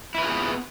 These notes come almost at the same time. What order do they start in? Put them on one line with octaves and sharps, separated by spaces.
E4 B4 F4 G#4 B3